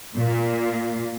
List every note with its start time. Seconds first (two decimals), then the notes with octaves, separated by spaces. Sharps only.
0.16 A#2